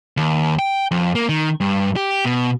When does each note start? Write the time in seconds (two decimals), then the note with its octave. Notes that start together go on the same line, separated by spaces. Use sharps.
0.17 D#2
0.59 G5
0.91 F2
1.15 A#3
1.29 D#3
1.60 G2
1.96 G4
2.25 B2